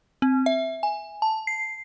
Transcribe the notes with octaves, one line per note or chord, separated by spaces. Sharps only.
C4
E5
G#5
A5
C7